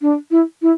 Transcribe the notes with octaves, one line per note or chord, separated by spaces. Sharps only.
D4
E4
E4